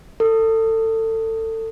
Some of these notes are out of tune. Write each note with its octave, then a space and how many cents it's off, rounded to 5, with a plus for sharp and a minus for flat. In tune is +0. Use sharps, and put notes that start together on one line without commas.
A4 +25